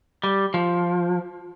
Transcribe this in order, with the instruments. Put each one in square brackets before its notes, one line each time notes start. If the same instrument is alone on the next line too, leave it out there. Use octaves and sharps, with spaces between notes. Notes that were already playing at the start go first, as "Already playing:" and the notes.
[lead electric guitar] G3
F3